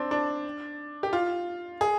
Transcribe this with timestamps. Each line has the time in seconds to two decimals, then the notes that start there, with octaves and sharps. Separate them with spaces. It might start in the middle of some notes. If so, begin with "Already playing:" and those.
Already playing: C4 D4
0.11 D4
1.03 G4
1.13 F4
1.81 G#4